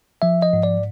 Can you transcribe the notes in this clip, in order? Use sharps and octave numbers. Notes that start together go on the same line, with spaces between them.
F3 E5
D#5
G#2
D5